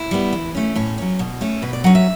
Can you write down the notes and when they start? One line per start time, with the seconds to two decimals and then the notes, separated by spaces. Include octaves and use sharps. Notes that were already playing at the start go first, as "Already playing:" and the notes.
Already playing: E4
0.11 G3 B3
0.33 E3
0.55 A3 C#4
0.75 A2 C#4
0.98 F#3 C#4
1.19 B2
1.41 A3 C#4
1.62 B2 B4
1.73 D5
1.84 F#3 C#4 F#5
1.95 E5